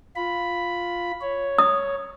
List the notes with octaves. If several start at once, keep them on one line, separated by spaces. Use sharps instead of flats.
F4 B5
C#5
D#6